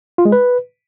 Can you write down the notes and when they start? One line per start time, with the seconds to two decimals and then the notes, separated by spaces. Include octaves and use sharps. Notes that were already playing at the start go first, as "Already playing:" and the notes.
0.18 F4
0.25 G#3
0.32 B4